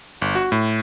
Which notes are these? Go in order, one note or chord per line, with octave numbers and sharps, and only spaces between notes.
G1
F#4
A2